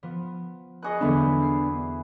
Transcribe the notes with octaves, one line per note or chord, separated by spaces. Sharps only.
F3 B3
G#4 B4 D#5 C#6 F#6
E2 D3 F#3 B3 D4 B4 E5
C7